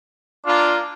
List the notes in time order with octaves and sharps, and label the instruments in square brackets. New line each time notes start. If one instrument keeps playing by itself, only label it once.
[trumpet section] A#3 F4 [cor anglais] D4